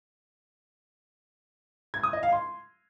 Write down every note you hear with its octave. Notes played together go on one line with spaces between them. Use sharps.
G#6
D#6
D#5
F5
C6